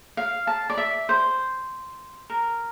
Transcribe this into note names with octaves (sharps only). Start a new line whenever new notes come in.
F5
A5
D5
E5
C5
A#4